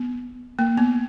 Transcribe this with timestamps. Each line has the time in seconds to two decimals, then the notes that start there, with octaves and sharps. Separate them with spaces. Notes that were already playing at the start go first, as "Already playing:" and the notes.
Already playing: B3
0.59 A#3
0.77 B3